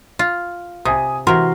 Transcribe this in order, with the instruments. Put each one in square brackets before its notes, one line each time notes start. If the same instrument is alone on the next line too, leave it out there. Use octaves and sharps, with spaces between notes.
[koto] F4
[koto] C3 [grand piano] G#5 D#6
[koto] C3 A#4 [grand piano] E3 F#4 C6